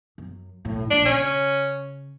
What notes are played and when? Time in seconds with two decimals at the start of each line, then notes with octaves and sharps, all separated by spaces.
0.18 F#2
0.65 B1 A2
0.90 A#1 A#2 D4
1.05 C#3 C#4